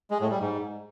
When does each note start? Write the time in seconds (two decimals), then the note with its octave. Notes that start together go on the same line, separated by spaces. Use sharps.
0.10 G#3
0.20 A2
0.30 G3
0.40 G#2